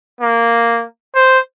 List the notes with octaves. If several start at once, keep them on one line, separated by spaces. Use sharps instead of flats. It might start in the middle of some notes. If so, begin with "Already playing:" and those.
A#3
C5